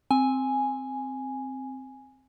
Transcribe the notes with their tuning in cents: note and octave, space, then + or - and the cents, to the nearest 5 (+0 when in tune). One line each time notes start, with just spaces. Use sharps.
C4 +0 G#5 +0